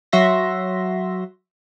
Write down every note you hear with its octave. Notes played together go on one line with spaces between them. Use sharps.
F#3 F#4 E5 C6 A#6